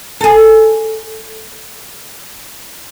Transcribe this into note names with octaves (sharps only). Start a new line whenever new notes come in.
G#4 A4